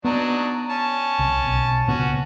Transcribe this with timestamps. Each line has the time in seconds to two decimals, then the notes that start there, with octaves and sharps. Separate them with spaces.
0.05 F#3 B3 D4 D#4
0.70 C#4 A5
1.19 C2
1.46 B1
1.88 C#2 A#2 B3 C#4 F#4